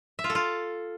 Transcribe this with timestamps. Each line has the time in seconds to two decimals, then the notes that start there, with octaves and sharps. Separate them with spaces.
0.19 E5
0.24 F4
0.30 A4
0.35 F4